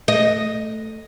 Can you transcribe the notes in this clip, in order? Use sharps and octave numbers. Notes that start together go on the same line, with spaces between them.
A3 D#5